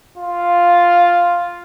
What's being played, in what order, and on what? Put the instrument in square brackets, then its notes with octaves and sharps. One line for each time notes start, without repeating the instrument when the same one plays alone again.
[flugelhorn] F4